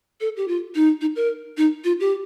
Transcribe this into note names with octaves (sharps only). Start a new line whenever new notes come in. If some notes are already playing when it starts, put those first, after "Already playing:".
A4
G4
F4
D#4
D#4
A#4
D#4
F4
G4